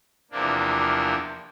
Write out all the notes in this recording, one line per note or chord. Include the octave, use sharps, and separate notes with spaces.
E2 C3 F3 A#3 D4